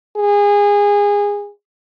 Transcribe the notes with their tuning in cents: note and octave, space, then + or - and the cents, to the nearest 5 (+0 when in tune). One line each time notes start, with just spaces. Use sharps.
G#4 -25